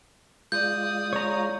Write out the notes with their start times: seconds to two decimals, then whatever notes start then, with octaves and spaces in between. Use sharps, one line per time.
0.52 G#3 F4 D5 D#6 G6
1.13 C#5 A#5